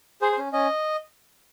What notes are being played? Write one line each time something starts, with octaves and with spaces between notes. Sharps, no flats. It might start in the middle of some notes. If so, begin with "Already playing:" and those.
G#4 C5
C5
C#4
C#4 D#5